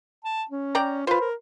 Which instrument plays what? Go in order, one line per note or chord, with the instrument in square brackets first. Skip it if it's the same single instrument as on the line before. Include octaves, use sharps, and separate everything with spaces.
[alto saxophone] A5
C#4
[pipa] D5 G5 A#5
[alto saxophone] F4 [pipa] B4 C5
[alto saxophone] A#4